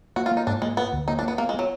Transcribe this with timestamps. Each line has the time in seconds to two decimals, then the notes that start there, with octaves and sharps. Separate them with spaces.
0.16 A#3 F#4
0.26 F4
0.31 A#3
0.37 D#4
0.47 G#2 D4
0.62 G#3 A#3
0.77 A#3 B3
0.93 D2
1.08 A#3 D#4
1.19 D4
1.23 A#3
1.28 B3
1.38 A#3 B3
1.49 G#3
1.54 F#3 B3